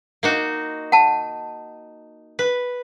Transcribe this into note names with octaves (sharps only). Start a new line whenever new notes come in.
A#3 D#4 F#4
F#5 A5
B4